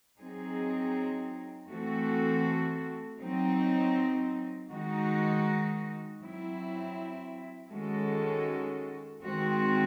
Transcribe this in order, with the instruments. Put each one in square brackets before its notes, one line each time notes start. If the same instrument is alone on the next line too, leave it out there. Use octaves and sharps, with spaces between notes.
[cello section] F#3 C4 D#4 G#4
E3 A3 C4 F#4 A4
F#3 C4 D#4
D#3 G#3 D#4 F#4
F#3 C4 E4
D#3 G#3 C#4 F#4 A4
D#3 G#3 C4 F#4